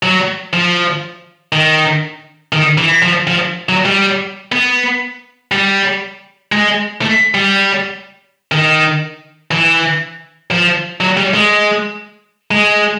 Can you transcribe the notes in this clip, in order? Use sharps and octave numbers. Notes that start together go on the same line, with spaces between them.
F#3
F3
D#3
D#3
E3
F3
F3
F#3
G3
B3
G3
G#3
A3
G3
D#3
E3
F3
F#3
G3
G#3
G#3